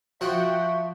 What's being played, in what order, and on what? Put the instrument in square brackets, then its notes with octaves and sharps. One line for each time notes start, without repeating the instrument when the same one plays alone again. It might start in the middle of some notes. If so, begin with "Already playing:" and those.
[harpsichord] F3 [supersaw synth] F#4 F#5 G5 [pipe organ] E5 C#6